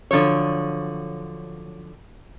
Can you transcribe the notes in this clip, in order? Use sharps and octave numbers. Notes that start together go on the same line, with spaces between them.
D3 F3 F#3 C#5